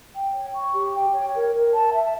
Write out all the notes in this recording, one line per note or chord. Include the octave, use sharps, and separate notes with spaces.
G5
C#5
C#6
G4
G5
C#5
A#4
A#4
A5
E5